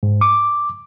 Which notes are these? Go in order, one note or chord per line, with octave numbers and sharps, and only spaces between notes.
G#2
D6